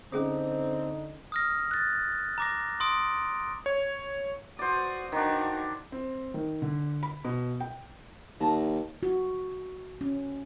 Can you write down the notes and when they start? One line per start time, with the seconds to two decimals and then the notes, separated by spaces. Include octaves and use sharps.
0.12 D3 C4 C#4 D#4 G#4 D#6
1.32 D#6 F6 A#6
1.71 F#6 A6
2.38 A#5 D6 A#6
2.80 C6 D#6 D7
3.66 C#5
4.59 F#4 C5 D5 D#6
5.12 D#3 D4 D#4 F#4
5.92 C4
6.34 D#3
6.62 D3
7.03 B5
7.25 B2
7.60 G5
8.40 D#2 D#5 A5 A#5
9.03 F#4
10.01 C#4